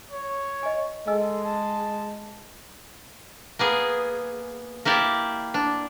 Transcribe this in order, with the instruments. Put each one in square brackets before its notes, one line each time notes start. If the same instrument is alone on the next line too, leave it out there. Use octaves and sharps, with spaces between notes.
[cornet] C#5
[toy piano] D#5 G#5
[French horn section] G#3 [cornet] A4 [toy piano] D#5 G#5 E6
[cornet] A5
[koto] A#3 B3 G#4
A#3 E4 G4 D5
D4